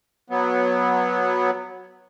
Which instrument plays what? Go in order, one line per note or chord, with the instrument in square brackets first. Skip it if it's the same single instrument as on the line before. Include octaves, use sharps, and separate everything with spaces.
[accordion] F#3 B3